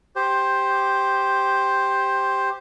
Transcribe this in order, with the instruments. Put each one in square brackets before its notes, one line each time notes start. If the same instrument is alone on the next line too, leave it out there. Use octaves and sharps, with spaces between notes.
[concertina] G4 C5